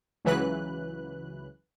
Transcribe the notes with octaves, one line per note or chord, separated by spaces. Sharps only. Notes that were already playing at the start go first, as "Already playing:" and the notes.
C#2 C#3 E3 F#3 B4 F#6